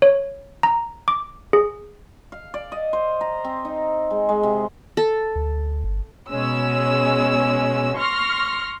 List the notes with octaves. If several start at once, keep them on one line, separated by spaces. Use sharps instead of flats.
C#5
A#5
D6
G#4
F5
D5
D#5
C5
A#5
C4
D#4
G#3
G#3
C3
A4
D2
G1
B2 G#3 C#4 E6
C6 C#6 F6 A#6